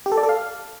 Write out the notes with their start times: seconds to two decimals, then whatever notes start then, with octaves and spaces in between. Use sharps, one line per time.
0.06 G4
0.12 A4
0.17 D5
0.23 A4
0.29 F5